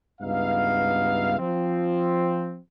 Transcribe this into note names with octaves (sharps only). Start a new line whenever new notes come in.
C#2 G2 B3 D#4 E5 F5
F3 C4